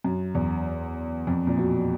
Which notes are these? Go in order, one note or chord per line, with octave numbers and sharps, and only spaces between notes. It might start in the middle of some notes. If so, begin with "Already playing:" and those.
F#2
E2
F2
A#2
B2